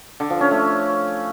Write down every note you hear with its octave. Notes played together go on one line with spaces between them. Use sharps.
D3
F3
C#4
A3